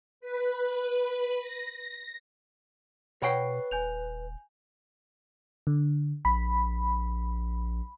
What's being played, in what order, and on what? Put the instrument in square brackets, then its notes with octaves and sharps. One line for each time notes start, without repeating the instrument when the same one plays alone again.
[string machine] B4
A#6
[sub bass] B2 [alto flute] B4 [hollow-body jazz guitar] C#5 F#5 G5 [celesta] B5 C#6 C7
[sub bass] D#1 [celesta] G#5 G6 F7
[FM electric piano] D3
[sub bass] A#1 [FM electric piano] B5